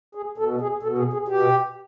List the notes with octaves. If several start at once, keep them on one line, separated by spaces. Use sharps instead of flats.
G#4
B2 A4
G#4
B2 A4
G#4
G#4
B2 G4